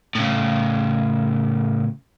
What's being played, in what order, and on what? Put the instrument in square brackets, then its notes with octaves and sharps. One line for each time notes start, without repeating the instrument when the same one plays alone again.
[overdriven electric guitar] A2 C#3